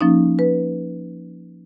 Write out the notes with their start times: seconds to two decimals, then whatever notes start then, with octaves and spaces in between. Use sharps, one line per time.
0.01 F3 A#3 C#4 D#4
0.39 B4